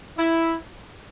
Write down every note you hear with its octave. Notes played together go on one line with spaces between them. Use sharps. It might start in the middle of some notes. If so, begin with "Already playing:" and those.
E4